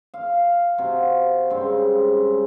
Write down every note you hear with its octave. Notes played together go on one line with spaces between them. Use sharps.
F5
C3 F#4 F5
G2 C#3 G#3 C4